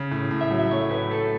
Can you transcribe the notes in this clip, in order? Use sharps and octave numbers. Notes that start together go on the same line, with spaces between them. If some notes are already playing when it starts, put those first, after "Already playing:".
Already playing: C#3
A2
A2
E5
F#3
E5
A3 C#5
A2 B4
A3 A4